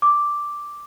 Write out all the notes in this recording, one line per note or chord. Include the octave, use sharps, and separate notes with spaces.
D6